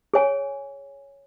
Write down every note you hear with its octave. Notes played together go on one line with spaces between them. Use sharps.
G#4 C#5 G#5